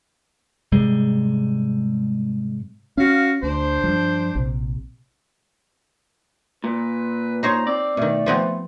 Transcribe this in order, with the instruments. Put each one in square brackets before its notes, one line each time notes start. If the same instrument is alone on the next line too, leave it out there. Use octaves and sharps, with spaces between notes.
[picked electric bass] G#2 C3 G3 G#3
[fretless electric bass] C#4 [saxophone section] F#4 F5
[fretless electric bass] D2 [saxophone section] D4 C5
[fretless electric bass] G2 F3
A#1 C3
[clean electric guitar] A#2 [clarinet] B4
[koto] D#4 C5 C#5 [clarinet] A#5
[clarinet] C4 [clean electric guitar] D5
[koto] B2 D#3 [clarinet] A3
[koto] F3 B3 C4